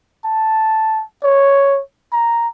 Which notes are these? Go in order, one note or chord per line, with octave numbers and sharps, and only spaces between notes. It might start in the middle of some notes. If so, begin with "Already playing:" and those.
A5
C#5
A#5